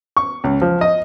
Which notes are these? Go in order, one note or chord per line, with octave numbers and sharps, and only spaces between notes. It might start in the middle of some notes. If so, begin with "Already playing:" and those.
C#6
C#2
F3
D#5